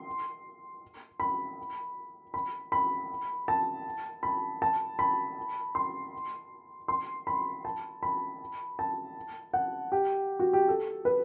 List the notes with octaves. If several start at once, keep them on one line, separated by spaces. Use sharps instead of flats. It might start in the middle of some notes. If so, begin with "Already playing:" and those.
Already playing: C6
B5
B5
B5
A5
B5
A5
B5
C6
C6
B5
A5
B5
A5
F#5
G4
F#4
G4
A4
B4